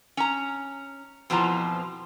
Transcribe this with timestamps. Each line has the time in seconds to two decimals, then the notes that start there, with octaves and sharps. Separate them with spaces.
0.17 C#4 A#5
1.30 F2 B2 E3 F3 A#5